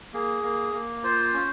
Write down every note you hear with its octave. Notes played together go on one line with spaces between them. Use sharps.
A#3 G#4
A#3
A#3
F4 C5
C#4